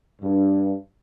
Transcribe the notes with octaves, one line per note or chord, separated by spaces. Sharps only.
G2